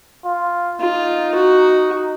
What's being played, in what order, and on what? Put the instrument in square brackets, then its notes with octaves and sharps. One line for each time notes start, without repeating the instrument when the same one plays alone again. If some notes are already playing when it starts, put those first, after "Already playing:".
[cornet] F4
[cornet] D#4 [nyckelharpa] F4
[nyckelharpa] F#4